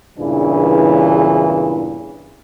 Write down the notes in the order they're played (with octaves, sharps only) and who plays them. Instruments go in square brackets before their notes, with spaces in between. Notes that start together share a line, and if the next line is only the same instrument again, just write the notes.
[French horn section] E2 G2 A#2 C#3 E3 D4